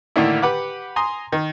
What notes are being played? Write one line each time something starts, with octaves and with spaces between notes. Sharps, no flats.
A2 D3 D#3 A#3 D4 E4
G4 B4 F#5 D6
G#5 A#5 C6 D#6
D#3